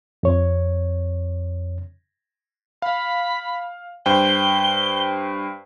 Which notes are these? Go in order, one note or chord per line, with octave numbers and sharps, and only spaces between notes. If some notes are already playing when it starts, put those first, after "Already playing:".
F2 C#5
F5 B5
G2 C5 G5 G7